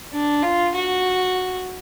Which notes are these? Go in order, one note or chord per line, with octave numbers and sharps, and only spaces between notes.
D4
F4
F#4